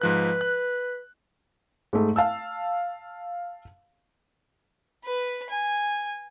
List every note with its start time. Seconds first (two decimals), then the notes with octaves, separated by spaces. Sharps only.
0.02 G#2 F3 B4 F#6
0.41 F#6
1.93 G#2 A3
2.16 F5 A5 E6
5.05 B4
5.50 G#5